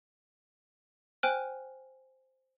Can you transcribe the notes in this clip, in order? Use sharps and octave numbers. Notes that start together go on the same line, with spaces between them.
C5 G5 G#5 F6 F#6